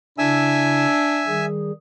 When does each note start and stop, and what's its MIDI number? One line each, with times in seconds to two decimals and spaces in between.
0.18 0.86 49
0.18 1.38 62
0.18 0.86 64
0.18 1.45 76
0.18 1.45 80
0.18 1.45 88
1.27 1.72 51
1.27 1.72 55
1.27 1.72 68